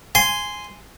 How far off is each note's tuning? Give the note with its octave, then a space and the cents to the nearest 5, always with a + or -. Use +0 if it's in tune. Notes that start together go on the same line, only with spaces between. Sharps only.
G#5 +0 C6 -10